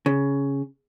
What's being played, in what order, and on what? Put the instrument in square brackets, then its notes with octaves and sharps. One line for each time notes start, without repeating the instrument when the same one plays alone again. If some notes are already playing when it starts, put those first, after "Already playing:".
[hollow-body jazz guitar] C#3